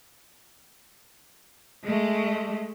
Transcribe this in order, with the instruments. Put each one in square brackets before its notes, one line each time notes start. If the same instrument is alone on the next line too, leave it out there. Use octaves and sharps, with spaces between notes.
[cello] G#3 A3